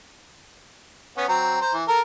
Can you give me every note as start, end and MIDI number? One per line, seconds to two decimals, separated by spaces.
1.17 1.26 59
1.17 1.26 61
1.29 1.57 54
1.29 1.57 60
1.29 1.57 82
1.61 1.74 72
1.61 1.74 82
1.74 1.84 52
1.88 2.01 69
1.88 2.01 70